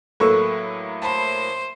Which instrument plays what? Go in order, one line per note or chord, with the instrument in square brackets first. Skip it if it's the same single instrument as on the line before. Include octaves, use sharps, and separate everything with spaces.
[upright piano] A2 F#3 A#3 [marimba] A4 [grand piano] B4 C#6 E6
[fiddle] C5 [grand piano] A5 B5